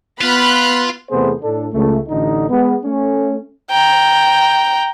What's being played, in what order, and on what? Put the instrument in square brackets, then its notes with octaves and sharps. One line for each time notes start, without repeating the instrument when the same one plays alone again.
[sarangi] B3 [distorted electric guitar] F4 [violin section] B5 F#6
[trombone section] E2 C3 A3 B3 G#4 C5
A2 D4 A4
C#2 A3
A1 D3 D#4
G#3 B3
A3 C#4
[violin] G5 A#5